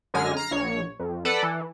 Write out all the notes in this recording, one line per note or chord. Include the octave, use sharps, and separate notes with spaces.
F#2 D3 G#3 G#5 F6 A#6
A#5 F6 C7
A#1 C#5
F2
A4 B4 D5 F#5
E3